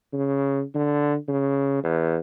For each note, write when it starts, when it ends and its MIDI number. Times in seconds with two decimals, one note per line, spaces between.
0.13 0.62 49
0.74 1.15 50
1.28 1.80 49
1.83 2.18 40